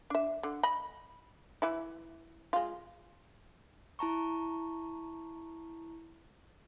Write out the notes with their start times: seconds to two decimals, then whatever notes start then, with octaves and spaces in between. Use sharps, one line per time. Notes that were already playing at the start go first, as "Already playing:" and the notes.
0.10 D4 E5
0.43 D3
0.63 D#5 B5
1.62 E3 E4
2.53 G#3 F4
3.99 E4 A5 A#5 C#6